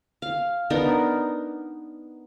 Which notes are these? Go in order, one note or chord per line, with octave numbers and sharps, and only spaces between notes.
F5
B3 D4 D#4 A#4